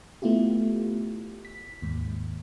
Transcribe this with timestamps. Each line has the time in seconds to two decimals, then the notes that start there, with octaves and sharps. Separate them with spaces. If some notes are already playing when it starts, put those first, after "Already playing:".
0.22 A3 B3 E4 F4 G4
1.45 B6
1.82 D#2 G#2